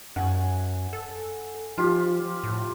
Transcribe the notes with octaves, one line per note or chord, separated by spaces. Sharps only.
F#2 F#5 G#5
A4
F3 F4 G4
A2